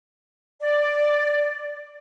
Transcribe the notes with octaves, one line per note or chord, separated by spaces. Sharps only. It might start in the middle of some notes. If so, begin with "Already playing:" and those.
D5